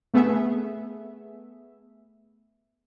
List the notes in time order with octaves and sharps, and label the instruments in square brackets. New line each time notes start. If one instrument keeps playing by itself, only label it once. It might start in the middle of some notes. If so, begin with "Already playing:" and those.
[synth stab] A3 B3 G#4 E5